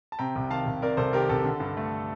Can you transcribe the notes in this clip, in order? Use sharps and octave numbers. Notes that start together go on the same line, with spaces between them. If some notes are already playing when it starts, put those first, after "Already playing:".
A5
C3 G5 A#5
C2
D#3 F5 A5
C2
C3 A#4 D5
C2 A4 C5
D#3 G4 A#4
C2 A4
D3
G2
A3